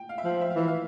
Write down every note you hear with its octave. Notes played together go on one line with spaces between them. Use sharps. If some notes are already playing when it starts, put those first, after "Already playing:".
Already playing: G5
F5
E5
F3 F5
E5
F5
E3 E5
F5